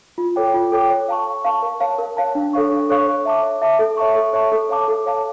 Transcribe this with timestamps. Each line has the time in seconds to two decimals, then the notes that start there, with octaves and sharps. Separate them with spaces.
0.18 F4
0.36 A4 C#5 G5 D6
0.54 F4
0.72 A4 C#5 G5 D6
0.90 C#5
1.08 F5 A5 C#6
1.27 C#5
1.45 F5 A5 C#6
1.62 A#4
1.80 C#5 F5 A5
1.99 A#4
2.17 C#5 F5 A5
2.35 D4
2.53 A4 C#5 F5 C#6
2.72 D4
2.89 A4 C#5 F5 C#6
3.07 C#5
3.25 E5 A5 D6
3.43 C#5
3.62 E5 A5 D6
3.79 A4
3.97 C#5 E5 A5 C#6
4.15 A4
4.33 C#5 E5 A5 C#6
4.52 A4
4.69 C#5 F5 A5 D6
4.88 A4
5.06 C#5 F5 A5 D6